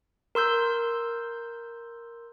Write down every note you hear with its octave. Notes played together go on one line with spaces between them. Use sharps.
A#4 C6 E6 G6